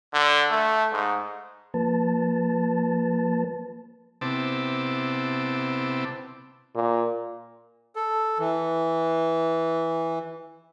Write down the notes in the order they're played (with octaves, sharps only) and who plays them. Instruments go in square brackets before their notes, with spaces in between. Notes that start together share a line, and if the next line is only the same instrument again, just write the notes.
[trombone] D3
A3
G#2
[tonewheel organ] F3 A#3 B4 A5
[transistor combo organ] C3 B3 C4 E4 A5 D6
[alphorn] A#2
[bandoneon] A4
E3